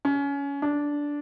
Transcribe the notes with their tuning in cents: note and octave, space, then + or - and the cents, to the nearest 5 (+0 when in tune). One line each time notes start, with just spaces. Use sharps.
C#4 +25
D4 -10